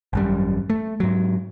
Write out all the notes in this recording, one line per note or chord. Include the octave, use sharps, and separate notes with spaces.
G#1 F#2 G3
A3
G#2 F#3